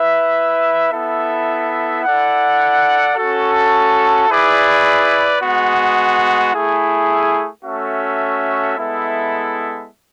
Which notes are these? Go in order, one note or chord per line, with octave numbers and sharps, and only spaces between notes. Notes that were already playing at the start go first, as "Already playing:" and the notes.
Already playing: E4 B4 E5
B3 E4 A4 E5
E4 A4 D5 F#5
C#4 F#4 A4
E4 G#4 B4 D5
G#3 B3 F#4
A3 E4 G#4
A3 C#4 F#4 A4 E5
G#3 B3 E4 A4 E5